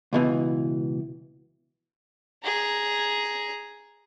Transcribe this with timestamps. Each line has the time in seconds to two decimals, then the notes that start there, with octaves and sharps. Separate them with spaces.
0.13 C#2 B2 E3
2.44 G#4 A#5